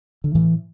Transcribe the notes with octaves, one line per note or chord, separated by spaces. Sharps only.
D3
A2 E3